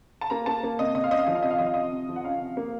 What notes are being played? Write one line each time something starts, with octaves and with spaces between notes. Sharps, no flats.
A5
A#3 A#5
A#3 A5
A#3
C3 D#5
C3 D#5
F5
C#4 D#5
F5
F3 D#5
F5
C3 D#5
F5
F3 D#5
F5
C3 D#5
C3
F3
F#5
C#4 F5
C3
A#3